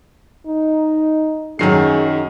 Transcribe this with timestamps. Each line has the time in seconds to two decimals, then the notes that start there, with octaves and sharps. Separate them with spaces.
0.47 D#4
1.59 F#2 D#3 F#3 D#4 G#4 C7